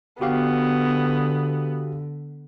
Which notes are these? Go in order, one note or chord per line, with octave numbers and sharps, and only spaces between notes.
D3 B3 F#4 G4 F5